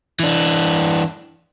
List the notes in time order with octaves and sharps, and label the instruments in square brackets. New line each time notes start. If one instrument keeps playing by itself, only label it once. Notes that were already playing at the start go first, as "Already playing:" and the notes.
[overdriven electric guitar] E3 D4